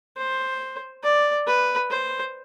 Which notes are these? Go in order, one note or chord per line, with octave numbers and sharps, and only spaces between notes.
C5
D5
B4
C5